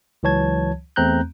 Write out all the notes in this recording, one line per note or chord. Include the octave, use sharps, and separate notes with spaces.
C#2 E3 F#3 C#5 A5 G#6
E2 A3 C4 A#5 F#6 G6